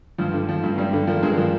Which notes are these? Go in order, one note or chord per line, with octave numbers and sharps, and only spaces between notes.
G2 F3
D3
F3
G2
G2 G3
D3
F3 A#3
G2 G#3
F3 A#3